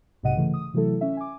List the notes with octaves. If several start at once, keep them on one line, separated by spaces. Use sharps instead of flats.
B1 G#2 C3 D#5 F#5 D#7
C#3 E3 A3
D#6
C3 E3 F#3 A3 E4 A4
C#4 E5
G#5 D6